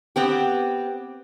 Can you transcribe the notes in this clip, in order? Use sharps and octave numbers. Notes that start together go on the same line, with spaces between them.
B3 C4 G4